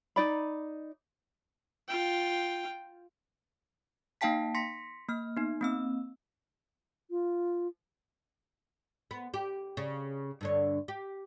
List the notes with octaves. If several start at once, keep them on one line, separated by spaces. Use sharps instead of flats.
D#4 D5 B5
F4 G5
A#3 D#4 F5 G5 A5 B6
C6 A#6 B6 C#7
A#3 F6
B3 D#4
A#3 C4 E6
F4
B3
G4
C#3
G2 D3 C#5
G4